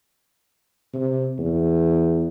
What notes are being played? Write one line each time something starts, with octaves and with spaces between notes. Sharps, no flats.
C3
E2